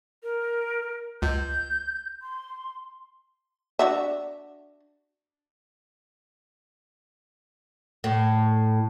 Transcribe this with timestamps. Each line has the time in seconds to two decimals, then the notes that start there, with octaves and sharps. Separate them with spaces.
0.23 A#4
1.22 C#2 G6
2.22 C6
3.79 D4 F#4 E5
8.04 A2